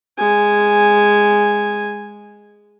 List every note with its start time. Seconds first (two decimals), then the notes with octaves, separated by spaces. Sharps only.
0.18 G#3 G#5